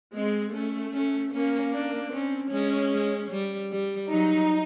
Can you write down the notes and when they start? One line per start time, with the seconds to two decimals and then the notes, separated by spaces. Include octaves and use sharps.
0.14 G#3 C4
0.53 A3 C#4
0.93 C#4
1.33 A#3 C#4
1.72 D4
2.12 C4 C#4
2.51 G#3 C#4
2.92 G#3
3.31 G3
3.71 G3
4.10 F#3 D#4